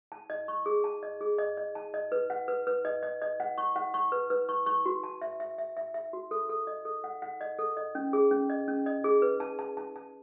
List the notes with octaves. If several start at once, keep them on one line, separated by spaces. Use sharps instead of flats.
A5
D#5
C#6
G#4
A5
D#5
G#4
D#5
D#5
A5
D#5
B4
F#5
B4
B4
D#5
D#5
D#5
F#5
C#6
F#5
C#6
B4
B4
C#6
C#6
F#4
A5
E5
E5
E5
E5
E5
F#4
A4
A4
D#5
A4
F#5
F#5
D#5
A4
D#5
C#4
G#4
C#4
D#5
C#4
D#5
G#4
B4
A5
A5
A5
A5